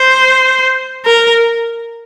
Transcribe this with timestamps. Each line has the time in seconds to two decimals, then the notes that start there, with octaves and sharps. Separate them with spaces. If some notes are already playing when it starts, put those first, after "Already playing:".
Already playing: C5
1.05 A#4